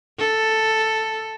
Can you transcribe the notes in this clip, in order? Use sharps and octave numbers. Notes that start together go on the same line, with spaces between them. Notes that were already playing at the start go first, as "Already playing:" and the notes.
A4